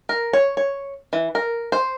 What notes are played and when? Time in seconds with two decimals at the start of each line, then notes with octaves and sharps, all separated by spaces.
0.09 A#4
0.33 C#5
0.57 C#5
1.13 E3
1.35 A#4
1.72 C5